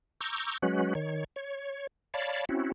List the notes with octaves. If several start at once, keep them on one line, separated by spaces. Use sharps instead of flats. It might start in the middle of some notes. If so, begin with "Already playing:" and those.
A#5 C#6 D6 E6 G6
F#3 G#3 C#4 F#4 B4
D#3 C#5
C#5
C#5 D5 F5 A5 B5
C4 C#4 E4 F#4